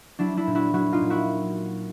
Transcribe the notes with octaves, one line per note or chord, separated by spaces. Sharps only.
F#3 D4 E4
D4 E4
A#2
E4 F#4
F#3 E4 F#4
D#4 F4
A#2
E4 F#4